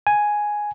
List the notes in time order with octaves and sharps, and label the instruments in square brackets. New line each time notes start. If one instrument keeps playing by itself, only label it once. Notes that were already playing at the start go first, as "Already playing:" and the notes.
[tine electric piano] G#5